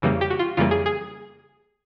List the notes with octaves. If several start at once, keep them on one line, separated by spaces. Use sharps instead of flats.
F2 C#3 E3 G3 A#3
G4
F#4
F4
F2 C#3 E3 G3 A#3 F4
G#4
G#4